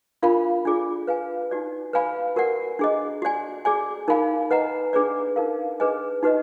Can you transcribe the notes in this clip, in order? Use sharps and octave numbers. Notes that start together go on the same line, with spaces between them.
D4 F4 A#4 F5 B5
D4 F4 G#4 D5
B4 F5 G#5
D#4 F#4 D5
B4 D5 F5 G#5 B5
F#4 A#4 D5 F#5
D4 G#4 D#5
F#4 D5 G#5
G#4 D5 G#5
D#4 A#4 F5 G#5 B5
B4 D#5 F#5 A#5
D4 G#4 B4 D5
D#4 A#4 F5
D4 G#4 B4 D#5 G#5
D#4 F#4 B4 D#5